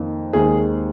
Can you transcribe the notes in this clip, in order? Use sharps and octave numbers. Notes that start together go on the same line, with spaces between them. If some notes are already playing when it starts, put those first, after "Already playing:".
Already playing: F2 D#3 A#3
D#2 D#3 G#3 C4 G#4